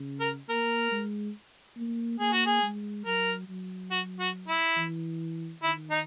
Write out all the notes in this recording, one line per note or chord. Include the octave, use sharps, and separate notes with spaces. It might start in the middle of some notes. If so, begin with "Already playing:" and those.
Already playing: C#3
A#4
A#3 A#4
G#3
A#3
A#3 G#4
F#4
G#4
G#3
F#3 A#4
F#3
F#4
F#4
E4
E3
D#3 E4
D#4